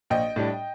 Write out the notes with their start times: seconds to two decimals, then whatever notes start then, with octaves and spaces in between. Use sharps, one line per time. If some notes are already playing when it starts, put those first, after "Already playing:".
0.10 A#1 D#5 G5
0.36 A2 G3 D4